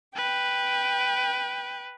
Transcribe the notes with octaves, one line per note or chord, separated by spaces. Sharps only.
B4 G5